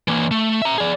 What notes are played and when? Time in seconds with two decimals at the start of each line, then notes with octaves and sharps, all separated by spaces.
0.08 E3 A#3
0.31 A3
0.62 E5 A#5
0.78 G#4 D5